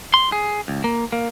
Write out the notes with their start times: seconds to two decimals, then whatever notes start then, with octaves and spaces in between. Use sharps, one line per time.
0.14 C6
0.32 G#4
0.68 C#2
0.84 A#3
1.12 A#3